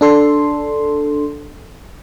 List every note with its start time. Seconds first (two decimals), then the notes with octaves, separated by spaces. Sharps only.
0.01 D4 A4 C6